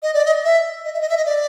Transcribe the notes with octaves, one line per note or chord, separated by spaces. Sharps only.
D#5
D5
D#5
E5
D#5
E5
D#5
E5
D#5
D5